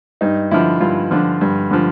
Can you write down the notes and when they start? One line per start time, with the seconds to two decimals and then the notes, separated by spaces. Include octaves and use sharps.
0.21 G2 D#4
0.51 D3 F3 E4
0.81 G2 F4
1.11 D3 F3
1.41 G2
1.71 D3 F3